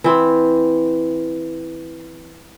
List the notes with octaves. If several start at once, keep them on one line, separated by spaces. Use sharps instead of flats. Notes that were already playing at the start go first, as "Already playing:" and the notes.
E3 C4